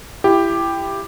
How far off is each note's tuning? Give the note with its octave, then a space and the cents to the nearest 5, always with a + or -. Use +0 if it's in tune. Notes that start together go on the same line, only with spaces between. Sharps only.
E4 +25 G4 +5